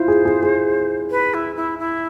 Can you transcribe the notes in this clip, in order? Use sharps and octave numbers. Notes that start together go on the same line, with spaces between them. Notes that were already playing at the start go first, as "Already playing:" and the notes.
Already playing: E4 F4 C5
G#4
G#4
G#4
B4
E4
E4
E4